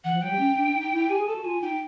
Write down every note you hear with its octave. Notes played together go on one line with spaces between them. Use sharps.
E3 F#5
F3
F#3 G5
G3
C#4
D4
D#4
E4
G4 G#5
G#4
A4 A5
F#4
F4 G#5
D#4 G5